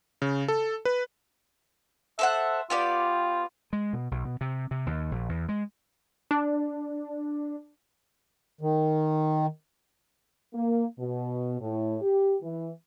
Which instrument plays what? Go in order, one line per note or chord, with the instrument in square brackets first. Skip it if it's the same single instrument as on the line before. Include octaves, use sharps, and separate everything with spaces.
[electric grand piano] C#3
A4
B4
[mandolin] A4 C5 F#5 [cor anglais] E5
[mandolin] B3 G4 D5 [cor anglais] F4
[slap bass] G#3
B2
B1
B2
C3
C3
D#2
A#1
E2
G#3
[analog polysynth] D4
[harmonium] D#3
[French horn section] A#3
B2
A2
G4
E3